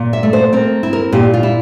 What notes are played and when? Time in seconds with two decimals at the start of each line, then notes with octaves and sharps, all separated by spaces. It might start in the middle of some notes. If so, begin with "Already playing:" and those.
Already playing: A#2
0.13 E5
0.23 A3
0.33 C5
0.53 C4 A#4
0.83 E4
0.93 A#4
1.13 A#2 G4
1.34 F4
1.43 E4